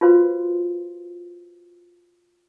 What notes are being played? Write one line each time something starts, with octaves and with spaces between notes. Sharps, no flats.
F4 F#4 B4 C5 F5 C6